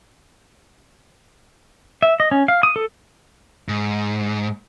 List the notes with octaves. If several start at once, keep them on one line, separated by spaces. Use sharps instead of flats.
E5
D#5
C#4
F5
D#6
A4
G#2